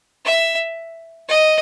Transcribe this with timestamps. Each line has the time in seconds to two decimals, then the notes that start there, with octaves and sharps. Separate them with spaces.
0.25 E5
1.29 D#5